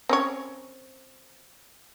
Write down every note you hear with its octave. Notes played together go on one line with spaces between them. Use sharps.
C4 C#4 C#5